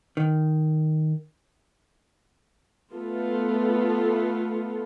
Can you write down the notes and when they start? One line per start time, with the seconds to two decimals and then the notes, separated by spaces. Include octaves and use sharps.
0.17 D#3
2.94 A3 B3 F4 A4